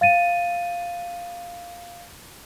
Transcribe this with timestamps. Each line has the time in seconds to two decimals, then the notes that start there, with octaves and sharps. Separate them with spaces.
0.01 F5 A6 D#7